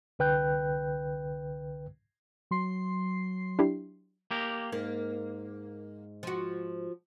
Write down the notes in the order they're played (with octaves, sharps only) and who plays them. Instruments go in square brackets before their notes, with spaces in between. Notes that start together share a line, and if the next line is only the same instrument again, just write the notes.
[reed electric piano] C2 D3 B4 G5 F#6 G6
[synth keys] F#3 C6 C7
[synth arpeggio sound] D4 E4 G4
[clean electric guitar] A#3 G4 A#4
[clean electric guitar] G#2 [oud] A#3
[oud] F3 F#4